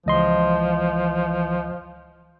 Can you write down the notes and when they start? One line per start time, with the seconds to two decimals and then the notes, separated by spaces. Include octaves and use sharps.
0.06 C#2 E3 F3 D#5 C6